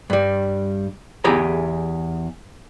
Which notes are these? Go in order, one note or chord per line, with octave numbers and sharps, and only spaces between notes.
G2 G3
E2 E4 G4 G#4 A#5